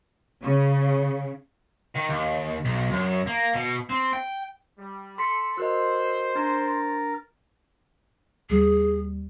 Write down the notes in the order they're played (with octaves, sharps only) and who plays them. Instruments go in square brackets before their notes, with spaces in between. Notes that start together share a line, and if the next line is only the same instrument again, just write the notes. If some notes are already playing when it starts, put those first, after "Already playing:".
[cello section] C#3
[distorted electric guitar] D#3
D#2
B1
F#2
A#3
B2
C4
G5
[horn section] G3
[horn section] A4 [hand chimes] C6 B6 C#7
[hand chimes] F#4 A#4 D#5 [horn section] C5 [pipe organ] E6 F#6
[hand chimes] D4 [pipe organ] A#4 A6
[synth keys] D#2 G3 [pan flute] G#4